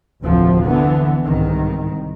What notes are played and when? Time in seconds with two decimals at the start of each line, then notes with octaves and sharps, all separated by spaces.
0.23 F1 D2 A2 C3 F3
0.63 D3 E3 B3
1.25 C2 G#2 D#3